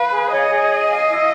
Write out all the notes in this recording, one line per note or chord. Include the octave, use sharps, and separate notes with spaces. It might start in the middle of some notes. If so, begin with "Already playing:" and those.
Already playing: B4 F5
G#4
C#5 D#5
G#4
G#5
F5
E4